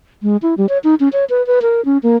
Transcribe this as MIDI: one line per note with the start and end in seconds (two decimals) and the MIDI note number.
0.23 0.37 56
0.42 0.54 64
0.57 0.69 55
0.69 0.78 73
0.84 0.95 63
1.00 1.09 61
1.13 1.25 73
1.30 1.45 71
1.47 1.60 71
1.62 1.84 70
1.85 1.98 61
2.03 2.17 58